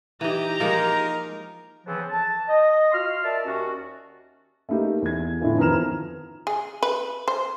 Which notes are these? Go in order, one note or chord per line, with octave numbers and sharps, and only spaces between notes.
E3 D#4 G4 A#5
F3 G#3 A#3 D#4 A#4
C#3 E3 F3 B3 C4
A5
D#5
F4 F#4 C6 F6
A#4 D5 E5 A5
D#2 C#4 F#4
A3 A#3 D#4 G4 D#5
E2 G#6
A2 D3 E3 F4
F2 D#3 B3 A#5 F6 E7
G#4
B4
C5